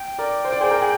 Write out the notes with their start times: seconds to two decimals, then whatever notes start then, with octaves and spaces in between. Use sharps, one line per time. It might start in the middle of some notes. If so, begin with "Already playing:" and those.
Already playing: G5
0.19 A#4 D5
0.45 C5
0.53 D5
0.61 G#4 C5
0.71 A#4
0.82 G#4